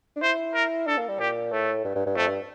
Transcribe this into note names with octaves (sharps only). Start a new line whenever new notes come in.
D4
E4 C5
A#4
D4 A4
A#3
G3
A#2 G4
A2 A3
G2
G2
G2
F2 A3
G2